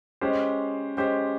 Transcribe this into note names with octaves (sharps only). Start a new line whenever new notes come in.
G#3 C#4 G4 C5
G#3 C#4 G4 C5